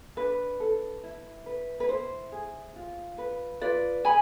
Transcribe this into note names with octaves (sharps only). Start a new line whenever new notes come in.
D4 B4
A4
E4
B4
B4
E4 C5
G#4
F4
B4
F4 B4 D5
G#4 G#5 B5